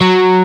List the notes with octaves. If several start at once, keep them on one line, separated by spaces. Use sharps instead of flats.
F#3